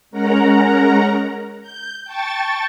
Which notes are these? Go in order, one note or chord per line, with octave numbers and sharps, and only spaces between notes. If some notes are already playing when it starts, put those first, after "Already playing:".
G#3 C#4 A#4 F#5 A#5
G6
G5 A5 C#6 A6